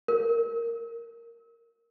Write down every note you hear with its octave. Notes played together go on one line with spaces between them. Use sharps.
A#4